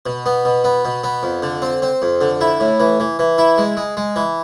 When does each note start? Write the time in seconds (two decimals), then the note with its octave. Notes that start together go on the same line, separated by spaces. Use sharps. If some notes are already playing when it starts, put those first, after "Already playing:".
0.06 B2
0.26 B3
0.45 B2
0.64 B3
0.85 B2
1.04 B3
1.23 F2
1.43 D3
1.62 C4
1.82 C4
2.02 F2
2.21 D3
2.41 E4
2.60 A2
2.80 E3
3.00 E3
3.19 E3
3.38 E4
3.58 G#3
3.77 G#3
3.97 G#3
4.16 E3